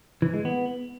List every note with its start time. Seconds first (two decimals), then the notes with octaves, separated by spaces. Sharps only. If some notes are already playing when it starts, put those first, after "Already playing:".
0.22 E3
0.34 G#3
0.45 B3